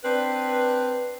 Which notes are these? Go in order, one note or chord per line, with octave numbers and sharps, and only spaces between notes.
C4 D4 B4